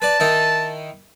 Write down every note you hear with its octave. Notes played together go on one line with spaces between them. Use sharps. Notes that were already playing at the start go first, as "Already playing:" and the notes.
B4 D5 A5
D#3 D#4 E4